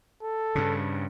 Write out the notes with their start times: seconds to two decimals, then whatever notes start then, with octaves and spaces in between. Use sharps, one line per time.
0.23 A4
0.55 G2 C#3